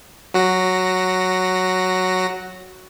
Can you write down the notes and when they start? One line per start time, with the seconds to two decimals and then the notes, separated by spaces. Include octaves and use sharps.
0.34 F#3 F#4 A#6